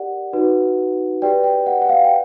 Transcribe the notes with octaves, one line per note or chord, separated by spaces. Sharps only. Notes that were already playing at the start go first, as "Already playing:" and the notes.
Already playing: G4 A#4 D5 F#5
D#4 F#4 B4
G4 B4 D5 G5
G5
F#5
F#5
F5
G5